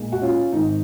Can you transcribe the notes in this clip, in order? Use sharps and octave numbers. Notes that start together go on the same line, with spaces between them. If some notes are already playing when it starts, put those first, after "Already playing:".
Already playing: B1 A#2 G#3
F#4
C#4 F4
G#1 G#2 D#3 D#4